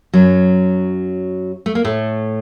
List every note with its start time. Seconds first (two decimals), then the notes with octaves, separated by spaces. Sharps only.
0.14 F#2 F#3
1.66 A3
1.75 A#3
1.85 A2 A3